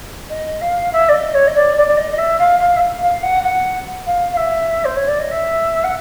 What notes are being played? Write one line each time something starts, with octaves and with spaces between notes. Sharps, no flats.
D#5
F5
E5
D5
D#5
C#5
D#5
D5
D5
D5
D#5
D#5
E5
F5
F5
E5
F5
F5
F#5
F#5
F5
F5
E5
C5
C#5
D5
D#5
E5
F#5